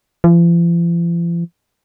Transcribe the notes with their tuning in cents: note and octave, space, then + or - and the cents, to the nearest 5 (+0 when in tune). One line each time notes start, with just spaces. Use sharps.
F3 -45